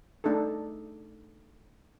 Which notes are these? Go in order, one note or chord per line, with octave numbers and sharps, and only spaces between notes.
A3 D4 D#4 G#4 A4